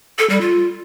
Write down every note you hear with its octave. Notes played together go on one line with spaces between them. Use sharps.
A4
G3
F4